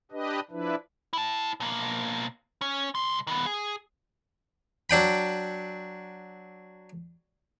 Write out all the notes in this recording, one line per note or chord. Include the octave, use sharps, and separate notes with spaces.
D4 G4 B4 D#5
F3 D4 E4 B4
E4 A5
B2 A#3
C#4
C2 C6
D#3 B3
G#4
F#3 D4 G5 B5